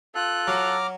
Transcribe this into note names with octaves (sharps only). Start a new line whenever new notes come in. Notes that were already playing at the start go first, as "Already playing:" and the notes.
F4 A4 F#6
F#3 A#5 D6 F6